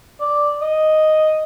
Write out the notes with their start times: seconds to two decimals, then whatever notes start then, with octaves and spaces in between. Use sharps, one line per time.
0.20 D5
0.61 D#5